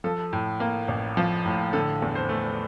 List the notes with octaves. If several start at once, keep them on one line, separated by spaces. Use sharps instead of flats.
F3 A4
A2
A#3
A1
F3
A2
D3 A4
E2
C5
A3